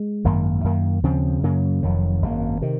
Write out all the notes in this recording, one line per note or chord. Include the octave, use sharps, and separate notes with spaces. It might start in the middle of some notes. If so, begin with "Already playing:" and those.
Already playing: G#3
G#1 F#2 D#3 A#3
F#2 D#3 A#3
D#2 C#3 F3 C4
F#2 C#3 F#3 A#3
F1 F2 D#3 F#3
G#1 F#2 D#3 A#3
C3 D#3